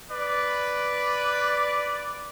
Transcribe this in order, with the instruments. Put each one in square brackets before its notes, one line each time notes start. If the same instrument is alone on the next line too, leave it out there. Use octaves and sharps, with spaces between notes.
[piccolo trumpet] B4 [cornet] D5